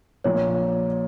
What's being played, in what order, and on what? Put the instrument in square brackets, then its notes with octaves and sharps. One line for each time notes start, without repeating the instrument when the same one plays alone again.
[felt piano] A#1 A#2 A#3 [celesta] C#5